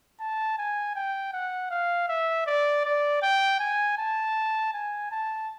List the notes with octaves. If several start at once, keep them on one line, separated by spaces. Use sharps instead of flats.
A5
G#5
G5
F#5
F5
E5
D5
D5
G5
G#5
A5
G#5
A5